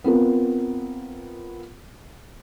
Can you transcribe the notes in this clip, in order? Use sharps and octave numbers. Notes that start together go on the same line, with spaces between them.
B3 C4 F4 A#4